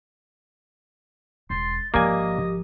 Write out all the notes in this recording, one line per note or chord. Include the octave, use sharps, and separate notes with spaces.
E1 C6 A6
G#1 F3 A#3 G4 D5 D#5 G#5